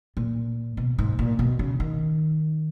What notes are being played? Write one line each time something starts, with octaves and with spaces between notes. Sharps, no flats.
A#2
B2
G#2
A#2
B2
C#3
D#3